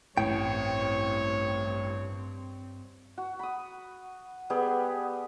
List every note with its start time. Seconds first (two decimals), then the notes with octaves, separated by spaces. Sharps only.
0.18 A1 G2 C4 C#5 G5
3.18 F#4
3.39 B5 D#6
4.50 G3 B3 G4 G#4